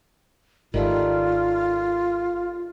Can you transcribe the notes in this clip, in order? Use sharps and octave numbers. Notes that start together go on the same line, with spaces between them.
G#1 D#3 G3 A3 F4